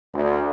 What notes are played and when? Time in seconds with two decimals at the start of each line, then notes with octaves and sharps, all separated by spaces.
0.14 D2